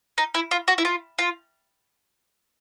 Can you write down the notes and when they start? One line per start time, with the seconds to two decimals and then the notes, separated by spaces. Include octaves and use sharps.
0.18 D#4
0.34 E4
0.51 F4
0.68 F#4
0.78 E4
0.85 F4
1.18 F4